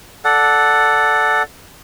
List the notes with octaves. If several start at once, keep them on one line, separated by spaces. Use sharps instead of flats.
A4 D5 F#5